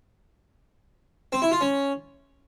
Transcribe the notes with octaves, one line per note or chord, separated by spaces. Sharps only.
C4
E4
F4
C#4